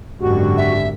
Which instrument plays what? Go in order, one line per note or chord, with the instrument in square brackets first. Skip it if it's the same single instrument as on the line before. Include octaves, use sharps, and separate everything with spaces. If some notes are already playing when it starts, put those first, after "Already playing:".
[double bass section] G#1 F#2 D3 [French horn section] D4 G4 [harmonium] F#4
[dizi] E5